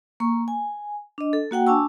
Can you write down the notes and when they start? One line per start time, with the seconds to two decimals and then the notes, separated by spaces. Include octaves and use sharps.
0.20 A#3 C#6
0.48 G#5
1.18 D4 D#5
1.33 A4
1.51 A#3 F#4 F#5 G5
1.67 D4 G#5 A5 C#6 E6